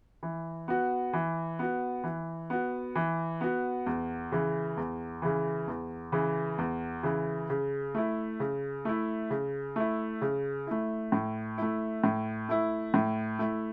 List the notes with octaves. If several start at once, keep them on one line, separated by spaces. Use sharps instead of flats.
E3
B3 F#4
E3
B3 F#4
E3
B3 F#4
E3
B3 F#4
E2
C#3 E3
E2
C#3 E3
E2
C#3 E3
E2
C#3 E3
C#3
A3 E4
C#3
A3 E4
C#3
A3 E4
C#3
A3 E4
A2
A3 E4
A2
A3 E4
A2
A3 E4